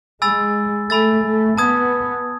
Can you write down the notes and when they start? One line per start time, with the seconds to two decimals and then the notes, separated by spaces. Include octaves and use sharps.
0.22 G#3 G#5 B5 E6 A6
0.90 A3 G#5 B5 E6 A6
1.24 A3
1.58 B3 A5 D#6 G#6